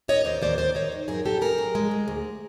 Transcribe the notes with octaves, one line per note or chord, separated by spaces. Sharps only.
D#2 C#5 D#5
D#2 C5 D5
D#2 C5 D5
D#2 C5 D5
D#3 C#5 D#5
D#3
F#2 G#4 A#4
F#2 G4 A4
F#2 G#4 A#4
F#2
G#3
D2
D2